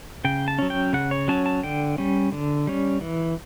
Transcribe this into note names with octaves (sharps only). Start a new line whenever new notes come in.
C#3 G5
A5
F#3 C#4
G5
C#3 F#5
C#5
F#3 C#4 A5
A5
D3 G5
G3 C#4
D3
G3 C#4
E3